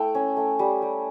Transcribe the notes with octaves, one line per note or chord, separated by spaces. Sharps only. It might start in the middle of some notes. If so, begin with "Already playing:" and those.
Already playing: A3 E4 G5
C#4
A3
G3
G3